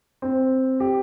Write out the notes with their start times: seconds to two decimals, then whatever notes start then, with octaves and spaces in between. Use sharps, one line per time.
0.22 C4
0.80 G4